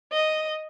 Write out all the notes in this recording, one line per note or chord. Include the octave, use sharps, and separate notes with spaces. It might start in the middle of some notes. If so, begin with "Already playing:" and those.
D#5